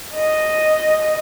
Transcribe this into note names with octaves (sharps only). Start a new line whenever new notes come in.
D#5